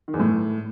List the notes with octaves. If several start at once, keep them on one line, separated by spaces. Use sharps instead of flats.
D#3
E2
A2